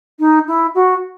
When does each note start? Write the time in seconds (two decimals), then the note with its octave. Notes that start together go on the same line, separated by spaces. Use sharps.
0.19 D#4
0.47 E4
0.75 F#4